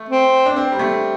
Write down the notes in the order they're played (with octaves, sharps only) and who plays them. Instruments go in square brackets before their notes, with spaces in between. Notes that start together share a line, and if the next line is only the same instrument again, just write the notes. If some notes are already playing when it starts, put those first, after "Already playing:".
Already playing: [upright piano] A3
[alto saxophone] C4
[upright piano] D4
C4
G3
A3